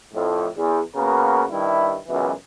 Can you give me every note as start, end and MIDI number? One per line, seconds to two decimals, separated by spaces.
0.13 0.47 41
0.13 0.47 45
0.57 0.80 40
0.96 1.44 49
0.96 1.44 58
0.96 1.44 59
0.96 1.44 66
0.96 1.44 70
0.96 1.44 71
1.51 1.97 43
1.51 1.97 51
1.51 1.97 55
1.51 1.97 64
2.08 2.31 37
2.08 2.31 42
2.08 2.31 47
2.08 2.31 52